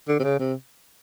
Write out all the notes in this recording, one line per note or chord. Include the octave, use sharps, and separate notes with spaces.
D3
C3
C#3
C3